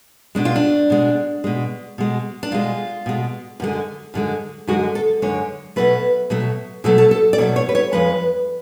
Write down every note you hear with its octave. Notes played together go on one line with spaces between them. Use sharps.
B2 G#3 D4
F4
D4
B2 G#3
B2 G#3
B2 G#3
D4
B2 G#3 F4
B2 G#3
F#2 D3 G#3
F#2 D3 G#3
F#2 D3 G#3 F#4
A4
F#2 D3 G#3 C#5
B2 F#3 A3 B4
B2 F#3 A3
B2 F#3 A3 A4
A4
A4
D5
B2 F#3 A3 C#5
C#5
B4
C#5
F2 F3 G#3 B4